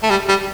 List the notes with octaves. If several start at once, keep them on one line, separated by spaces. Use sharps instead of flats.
A3
G3
G3